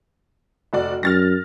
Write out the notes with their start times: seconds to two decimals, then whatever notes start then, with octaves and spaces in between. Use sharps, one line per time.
0.73 F1 F#4 D5
1.03 F#2 F6 A6 A#6